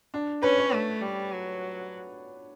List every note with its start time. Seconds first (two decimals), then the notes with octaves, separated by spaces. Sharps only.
0.14 D4
0.43 C#4 B4
0.58 C#5
0.73 A3
1.02 G3
1.32 F#3